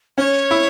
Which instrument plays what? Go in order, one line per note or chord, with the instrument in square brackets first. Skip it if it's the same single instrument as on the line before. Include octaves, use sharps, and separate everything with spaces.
[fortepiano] C#4 [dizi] C#5
[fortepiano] E4